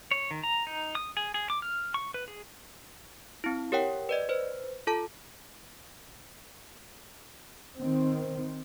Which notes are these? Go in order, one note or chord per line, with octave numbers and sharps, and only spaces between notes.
C#5
D#3
A#5
D#4
D#6
G#4
G#4
D6
F6
C#6
B4
G#4
C4 E4
G4 A#4 C#5 F#5 G5
B4 D5 D#5
B4 C5
F4 A4 A5
D#3 C4